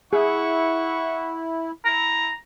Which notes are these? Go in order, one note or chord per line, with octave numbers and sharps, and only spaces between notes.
E4 G#4 E5 F#5 C#6
E4 A#5